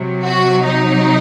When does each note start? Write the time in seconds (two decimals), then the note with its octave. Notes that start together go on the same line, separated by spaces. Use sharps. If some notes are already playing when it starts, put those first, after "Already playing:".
Already playing: C3 F#3
0.22 F#4
0.64 D#4